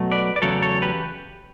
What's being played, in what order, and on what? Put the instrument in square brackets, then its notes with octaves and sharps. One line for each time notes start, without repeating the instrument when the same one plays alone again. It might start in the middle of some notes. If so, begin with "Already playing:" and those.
Already playing: [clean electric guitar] B2 F#3 A3
B4 D5
D5
E2 C#3 F#3 A3 A4 C#5
A4 C#5
G4 B4